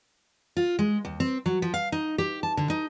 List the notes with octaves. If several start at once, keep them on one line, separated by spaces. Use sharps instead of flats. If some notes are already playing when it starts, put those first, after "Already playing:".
F4
G#3
D#2
C4
F#3
F3
F5
D#4
G4
A5
D3
D#4